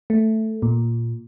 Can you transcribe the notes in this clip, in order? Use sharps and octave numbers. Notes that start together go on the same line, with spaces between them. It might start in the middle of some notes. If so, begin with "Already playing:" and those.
A3
A#2